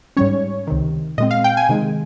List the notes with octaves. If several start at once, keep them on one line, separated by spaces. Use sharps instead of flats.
G#2 G3 C#4 C#5
C#2 C3 D#3
A#2 G#3 C4 D#5
F5
G5
G#5
C3 D#3 G#3